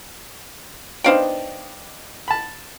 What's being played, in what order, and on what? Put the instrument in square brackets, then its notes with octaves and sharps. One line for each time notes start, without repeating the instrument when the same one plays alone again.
[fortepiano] B3 D4 D#4 [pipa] C5 F5 G5
[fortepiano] A5 B5